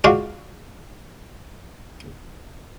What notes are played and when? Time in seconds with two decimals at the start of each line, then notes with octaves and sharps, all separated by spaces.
0.04 G#3 F4 F#4 D5